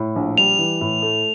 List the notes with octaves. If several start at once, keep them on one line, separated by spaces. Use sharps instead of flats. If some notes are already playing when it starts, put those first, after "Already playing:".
Already playing: A2
A#1
G3 F7
E3
A2
A3